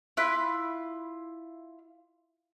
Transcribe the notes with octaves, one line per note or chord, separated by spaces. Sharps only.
E4 F4 B5 F#6